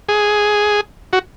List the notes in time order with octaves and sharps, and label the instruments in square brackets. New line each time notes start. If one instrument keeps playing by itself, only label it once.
[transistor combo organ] G#4
F#4